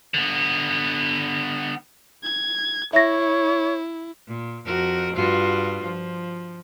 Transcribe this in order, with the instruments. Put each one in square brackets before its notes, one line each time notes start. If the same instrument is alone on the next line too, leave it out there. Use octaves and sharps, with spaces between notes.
[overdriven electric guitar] D3 B3
[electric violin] G#6
[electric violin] E4 [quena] C#5 [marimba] E5 A#6
[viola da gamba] A#2
F2 F#4 A#4
G2 F4 F#4
F3